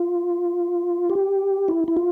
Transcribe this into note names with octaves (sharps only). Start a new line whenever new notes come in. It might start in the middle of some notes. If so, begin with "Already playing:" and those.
Already playing: F4
G4
E4
E4
F4